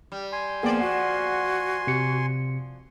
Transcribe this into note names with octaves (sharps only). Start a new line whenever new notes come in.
G3
G#5 C6
F3 A#3 B3 G#4 D5 G5
F#4 F#5
C3 C#7